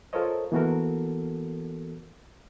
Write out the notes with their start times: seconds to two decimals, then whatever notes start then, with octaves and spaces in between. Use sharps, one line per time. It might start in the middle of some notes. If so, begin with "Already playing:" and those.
0.13 F4 A4 A#4 C5 C#5 D#5
0.52 E3 A#3 B3 F#4 A4 A#4